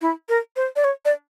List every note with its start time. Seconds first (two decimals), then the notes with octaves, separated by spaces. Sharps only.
0.02 E4
0.29 A#4
0.56 C5
0.76 D5
0.84 C#5
1.05 D5